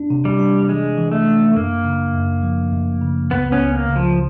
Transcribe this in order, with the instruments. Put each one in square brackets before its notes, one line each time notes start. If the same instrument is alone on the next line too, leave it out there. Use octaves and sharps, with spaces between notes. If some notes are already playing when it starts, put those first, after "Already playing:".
Already playing: [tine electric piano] D4
C3
[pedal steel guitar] G3
[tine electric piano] D4
[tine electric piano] E3 [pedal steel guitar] G#3
[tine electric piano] E3
[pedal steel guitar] A3
[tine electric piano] D4
[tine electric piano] F#2 [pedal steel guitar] A#3
[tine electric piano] C#3
F#2
F3
F#2
C#3
[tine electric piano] C#2 [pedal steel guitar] B3
[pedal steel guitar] B3 C#4
[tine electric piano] C#2
[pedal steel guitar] A#3
[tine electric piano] C#3
[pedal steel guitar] F3